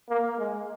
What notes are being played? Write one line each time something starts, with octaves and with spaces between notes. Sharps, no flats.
A#3
G#3